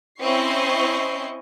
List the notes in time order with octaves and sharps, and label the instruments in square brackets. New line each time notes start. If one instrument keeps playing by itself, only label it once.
[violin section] C4 C#4 E4 D#5 C#6 C7